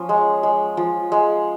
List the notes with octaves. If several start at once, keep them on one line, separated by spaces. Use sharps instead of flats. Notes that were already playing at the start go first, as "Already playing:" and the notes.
Already playing: F3 C#4
G#3
G#3
F3
G#3